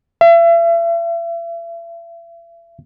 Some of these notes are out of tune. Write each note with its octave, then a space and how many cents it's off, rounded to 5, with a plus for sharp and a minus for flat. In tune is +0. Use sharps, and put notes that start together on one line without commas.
E5 +40